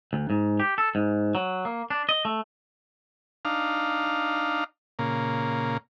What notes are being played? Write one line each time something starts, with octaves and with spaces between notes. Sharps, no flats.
D2
G#2
G4
A4
G#2
F#3
A#3
D4
D#5
A3
D4 D#4 F5
A#2 C#3 A#3